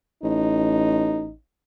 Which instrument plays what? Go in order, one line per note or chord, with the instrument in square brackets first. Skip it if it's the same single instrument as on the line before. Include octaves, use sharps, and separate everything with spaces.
[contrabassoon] A1 [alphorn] D#4